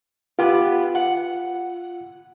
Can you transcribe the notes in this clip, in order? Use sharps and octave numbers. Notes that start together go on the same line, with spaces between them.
B3 F4 G4
F#5